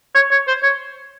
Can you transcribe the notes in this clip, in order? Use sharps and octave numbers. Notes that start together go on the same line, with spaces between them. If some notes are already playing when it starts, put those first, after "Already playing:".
C#5
C#5
C5
C#5